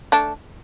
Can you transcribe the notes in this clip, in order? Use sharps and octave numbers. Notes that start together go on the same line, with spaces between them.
A3 D4